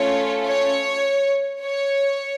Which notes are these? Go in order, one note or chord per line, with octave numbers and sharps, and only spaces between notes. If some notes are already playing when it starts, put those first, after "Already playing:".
Already playing: A3 C#4 F4 A4 C#5
C#5
C#5